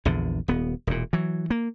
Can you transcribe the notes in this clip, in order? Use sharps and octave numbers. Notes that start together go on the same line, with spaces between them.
A#1 E2 D3
D#1 B3
E1 A#2
E3 F#3
A#3